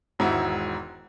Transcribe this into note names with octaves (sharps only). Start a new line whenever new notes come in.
E1 G#2 D#3 E4 F#4